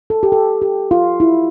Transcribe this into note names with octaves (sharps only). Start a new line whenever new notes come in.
A4
G4
A4
G4
F4
E4